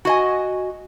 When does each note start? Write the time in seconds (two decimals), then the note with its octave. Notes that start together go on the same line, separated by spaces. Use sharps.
0.05 F#4 D#5 G#5